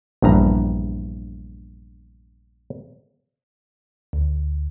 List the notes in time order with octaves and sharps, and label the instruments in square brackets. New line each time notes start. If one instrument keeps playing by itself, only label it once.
[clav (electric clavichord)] A#1 E2 G2 A#5
[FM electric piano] D2